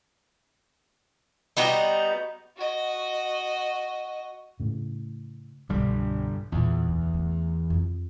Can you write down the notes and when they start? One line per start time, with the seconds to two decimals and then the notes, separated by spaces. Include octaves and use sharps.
1.57 G3 B3 D#4 F#4
2.57 F#4 D#5
4.60 A2 C#3
5.69 C2 G2 B2 D3 G3
6.52 E2 A#2 C#3
6.88 D2
7.14 A3
7.70 F2